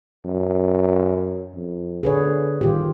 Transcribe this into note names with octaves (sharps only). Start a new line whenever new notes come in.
F#2
F2
D3 G#4 B4 C#5
G1 D#3 F4 G4